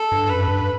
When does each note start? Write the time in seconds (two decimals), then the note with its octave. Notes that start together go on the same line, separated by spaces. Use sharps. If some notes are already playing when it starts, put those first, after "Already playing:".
Already playing: A4
0.12 G2
0.30 F#2 B4
0.48 G2